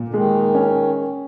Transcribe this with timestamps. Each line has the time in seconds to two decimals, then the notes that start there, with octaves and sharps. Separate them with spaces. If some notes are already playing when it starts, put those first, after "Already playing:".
Already playing: A#2
0.08 D3
0.14 D#3 G#3
0.55 C#4